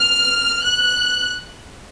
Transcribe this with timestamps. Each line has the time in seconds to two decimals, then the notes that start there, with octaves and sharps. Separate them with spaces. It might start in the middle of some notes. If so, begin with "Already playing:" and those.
Already playing: F6
0.62 F#6